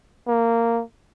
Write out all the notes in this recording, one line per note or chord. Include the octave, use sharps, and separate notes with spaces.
A#3